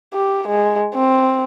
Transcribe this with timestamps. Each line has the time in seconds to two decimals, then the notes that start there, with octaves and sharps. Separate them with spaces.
0.13 G4
0.48 G#3
0.95 C4